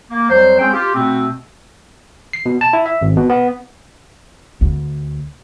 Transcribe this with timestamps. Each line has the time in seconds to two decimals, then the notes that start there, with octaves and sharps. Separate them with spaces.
0.10 A#3
0.30 F2 F#3 G3 C5
0.59 G#3 C4 C#4 G#4 G5
0.73 F4 G4
0.95 B2 A3 C4
2.33 C7
2.46 B2
2.61 A5
2.73 E4
2.86 E5
3.01 G#1
3.16 B2
3.29 B3
4.61 D2